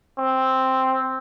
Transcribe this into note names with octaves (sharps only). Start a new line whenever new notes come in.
C4